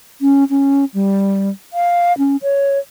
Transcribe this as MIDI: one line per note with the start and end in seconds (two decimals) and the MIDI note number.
0.21 0.44 61
0.50 0.85 61
0.94 1.50 55
1.73 2.16 77
2.18 2.37 61
2.43 2.78 73